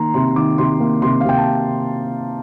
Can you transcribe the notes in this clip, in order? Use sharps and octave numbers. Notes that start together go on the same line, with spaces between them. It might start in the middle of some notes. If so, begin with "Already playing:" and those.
Already playing: D#3 A#3 A#5 C6
C3 C6
D#3 D6
C3 C6
A#3
C3 C6
F5
C3 G5
A5